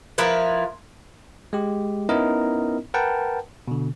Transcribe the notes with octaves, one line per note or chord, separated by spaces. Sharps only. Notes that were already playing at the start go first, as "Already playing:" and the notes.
F3 E4 A#4 B4
G#3 G4
B3 C#4 D#4 E4 A#4 D#5
A#4 B4 F#5 G5 A5
B2 D3